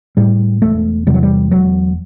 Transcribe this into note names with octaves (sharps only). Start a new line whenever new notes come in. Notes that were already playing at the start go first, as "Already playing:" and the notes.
A2 G3
E1 A3
E2 C3 G3
F#3
G3
E1 F#3